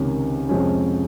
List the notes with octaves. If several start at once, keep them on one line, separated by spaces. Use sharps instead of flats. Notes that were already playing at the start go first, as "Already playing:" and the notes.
Already playing: C#2 C3 D#3 A#3 C#4
F2 C3 F3 G#3 C#4